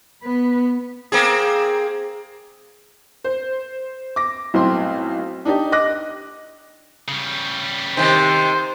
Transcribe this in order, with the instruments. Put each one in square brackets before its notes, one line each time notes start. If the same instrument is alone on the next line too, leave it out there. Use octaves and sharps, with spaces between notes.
[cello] B3 B4
[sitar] A#3 C4 G#4
[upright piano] C5
D6 A#6
B1 A2 C4 C6
D4 D#4 G4 D5
D#5 D6 F#6 A#6
[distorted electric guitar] C#3 G3
[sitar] C3 D#3 [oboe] C5